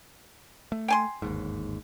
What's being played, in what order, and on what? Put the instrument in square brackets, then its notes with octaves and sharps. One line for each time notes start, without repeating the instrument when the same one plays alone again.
[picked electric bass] A3
[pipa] G5 G#5 C6
[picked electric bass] G1 D#2 G#2